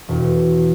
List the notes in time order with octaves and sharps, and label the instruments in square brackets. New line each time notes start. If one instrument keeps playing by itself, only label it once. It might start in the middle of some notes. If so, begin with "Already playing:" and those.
[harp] E1